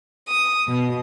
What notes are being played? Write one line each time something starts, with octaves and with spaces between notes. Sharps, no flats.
D#6
B2